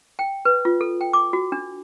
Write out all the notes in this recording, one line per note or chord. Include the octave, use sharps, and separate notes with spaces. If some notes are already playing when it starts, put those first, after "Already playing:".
G5
B4
F4
A4
G5
D6
F#4
D4